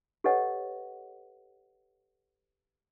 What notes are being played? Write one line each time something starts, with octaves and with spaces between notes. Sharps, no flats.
G4 A4 B4 C#5 D#5 F#5